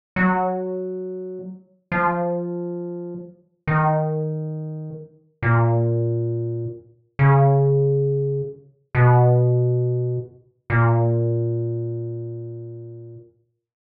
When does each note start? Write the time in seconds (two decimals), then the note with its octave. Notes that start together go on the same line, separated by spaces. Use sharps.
0.16 F#3
1.92 F3
3.67 D#3
5.43 A#2
7.19 C#3
8.95 B2
10.70 A#2